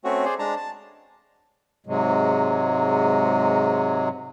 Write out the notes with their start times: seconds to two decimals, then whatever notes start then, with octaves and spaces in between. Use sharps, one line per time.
0.04 A3 C4 C#4 F#4
0.25 G#4 C5 D5
0.39 G#3 D4 A5 A#5
0.56 A5
1.86 G#2 C3 F#3 G#3